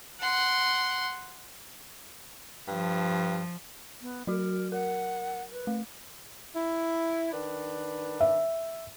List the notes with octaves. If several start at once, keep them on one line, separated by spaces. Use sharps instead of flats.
F#5 C6
G2 F3
B3
F#3 F#4 A#4
A#4 F#5
B4
A3
E4
D#3 D4 B4
E5